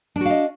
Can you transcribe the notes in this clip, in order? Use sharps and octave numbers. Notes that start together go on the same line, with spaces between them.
D4 F#4 D#5 F5